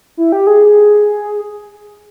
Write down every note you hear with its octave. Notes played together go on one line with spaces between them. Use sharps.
E4
G4
G#4